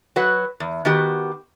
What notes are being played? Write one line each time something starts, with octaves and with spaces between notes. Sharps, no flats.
F#3 F#4 B4 F#5
E2
D#3 B3 F#4 G4